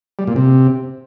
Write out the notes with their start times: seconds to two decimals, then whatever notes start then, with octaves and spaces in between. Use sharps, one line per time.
0.19 G3
0.27 A#2
0.36 C3